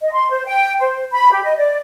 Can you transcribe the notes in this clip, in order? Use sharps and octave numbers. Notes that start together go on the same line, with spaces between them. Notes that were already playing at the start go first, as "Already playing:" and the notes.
D#5
C6
C5
G5
C5
B5
G4
D#5
D5